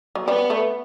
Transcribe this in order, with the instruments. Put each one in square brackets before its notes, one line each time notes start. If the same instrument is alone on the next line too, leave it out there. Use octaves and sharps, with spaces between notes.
[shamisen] F#3
[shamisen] G3 [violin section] B3
[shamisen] A3